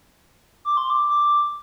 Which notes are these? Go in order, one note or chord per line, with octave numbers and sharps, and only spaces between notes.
D6
C6
D6
D6